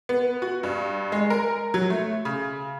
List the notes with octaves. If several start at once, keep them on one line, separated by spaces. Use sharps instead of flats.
B3
F#4
G2
G#3
A#4
F#3
A3
C#3